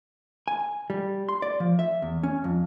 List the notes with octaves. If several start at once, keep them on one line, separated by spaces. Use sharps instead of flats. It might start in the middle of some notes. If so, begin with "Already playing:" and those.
G#5
G3
C6
D5
F3
E5
E2
C#4
F2